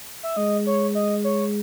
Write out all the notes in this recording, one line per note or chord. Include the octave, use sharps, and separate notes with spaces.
E5
G#3 D#5
C#5
D#5
C#5